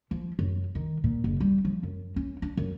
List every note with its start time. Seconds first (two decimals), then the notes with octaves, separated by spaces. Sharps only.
0.11 F3
0.39 F#2
0.75 D#3
1.04 A#2
1.24 F#1
1.40 G3
1.65 F3
1.83 F#2
2.16 C#4
2.42 D4
2.57 F#2